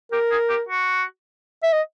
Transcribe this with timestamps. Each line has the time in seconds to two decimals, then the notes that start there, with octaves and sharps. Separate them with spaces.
0.12 G4 A#4
0.31 G#4
0.50 G4
0.69 F#4
1.63 E5
1.73 D#5